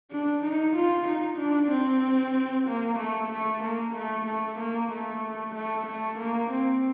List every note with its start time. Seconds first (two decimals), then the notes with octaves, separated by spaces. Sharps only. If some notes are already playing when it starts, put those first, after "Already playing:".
0.11 D4
0.44 D#4
0.76 F4
1.08 D#4
1.39 D4
1.71 C4
2.67 A#3
2.99 A3
3.32 A3
3.63 A#3
3.96 A3
4.27 A3
4.59 A#3
4.92 A3
5.55 A3
5.86 A3
6.19 A#3
6.51 C4